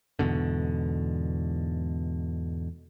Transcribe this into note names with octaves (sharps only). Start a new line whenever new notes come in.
E2 G#2 B2 D3